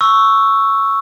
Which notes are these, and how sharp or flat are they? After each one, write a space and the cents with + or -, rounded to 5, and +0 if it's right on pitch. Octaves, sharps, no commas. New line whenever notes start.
C#6 +0 E6 +0